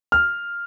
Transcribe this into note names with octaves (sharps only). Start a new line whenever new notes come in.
F6